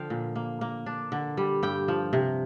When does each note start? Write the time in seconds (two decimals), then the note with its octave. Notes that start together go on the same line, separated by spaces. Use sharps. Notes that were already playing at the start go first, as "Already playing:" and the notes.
Already playing: D3 F3 F5 G5
0.10 A#2
0.36 A#3
0.61 A#3
0.86 D4
1.12 D3
1.37 G3
1.63 G2 G5
1.88 F3
2.13 C3